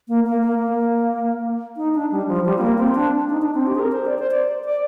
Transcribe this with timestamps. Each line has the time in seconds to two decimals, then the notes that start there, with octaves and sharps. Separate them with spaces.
0.08 A#3
0.26 A#3
0.43 A#3
0.59 A#3
1.77 D#4
1.95 D4
2.11 G3
2.28 F3
2.45 G3
2.58 C4
2.61 A#3
2.78 C4
2.95 D4
3.29 D#4
3.42 D4
3.54 C4
3.67 G4
3.75 G#4
3.80 A#4
3.92 C5
4.05 D5
4.18 C5
4.31 D5
4.64 D5